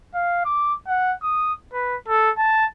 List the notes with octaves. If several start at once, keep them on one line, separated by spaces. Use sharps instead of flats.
F5
D6
F#5
D#6
B4
A4
A5